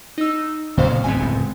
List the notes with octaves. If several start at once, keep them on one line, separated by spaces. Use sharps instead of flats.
D#4 E6
F2 A#2 C#3 F#3 C5 F5
G#1 D2 A2 B3 C4 G#5
D1 C#2